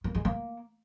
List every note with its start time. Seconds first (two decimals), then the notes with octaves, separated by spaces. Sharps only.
0.04 A#3
0.15 G#3
0.25 A#3